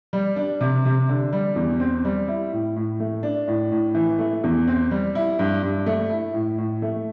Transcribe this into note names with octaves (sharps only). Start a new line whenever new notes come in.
G3
D4
C3
C3
D3
G3
E2
C4
G3
E4
A2
A2
A3
D4
A2
A2
E3
A3
E2
C4
G3
E4
G2
G2
A3
E4
A2
A2
A3